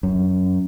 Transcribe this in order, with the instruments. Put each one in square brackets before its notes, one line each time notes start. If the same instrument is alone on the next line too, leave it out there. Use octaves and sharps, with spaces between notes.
[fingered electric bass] F#2